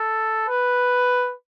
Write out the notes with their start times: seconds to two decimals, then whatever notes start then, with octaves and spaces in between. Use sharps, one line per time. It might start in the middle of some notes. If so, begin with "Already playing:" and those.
Already playing: A4
0.48 B4